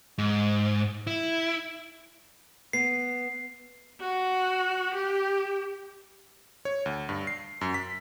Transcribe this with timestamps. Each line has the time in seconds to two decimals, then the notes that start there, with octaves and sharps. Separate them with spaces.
0.18 G#2
1.07 E4
2.73 B3 C7
4.00 F#4
4.95 G4
6.65 C#5
6.86 D2
7.09 G2
7.27 C7
7.61 F#2
7.74 B6